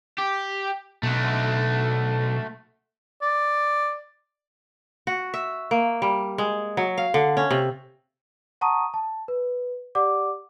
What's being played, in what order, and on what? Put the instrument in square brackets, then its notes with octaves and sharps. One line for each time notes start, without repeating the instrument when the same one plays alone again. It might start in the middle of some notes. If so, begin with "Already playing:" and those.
[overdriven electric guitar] G4
[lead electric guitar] B1 [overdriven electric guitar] A3 F#4
[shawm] D5
[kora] F#4
E5
A#3
G3
G#3
F#3
F5
D3
C#4
C3
[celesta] F#5 A5 A#5 C#6 D#6 D#7
A5
B4
G4 D5 F#5 D6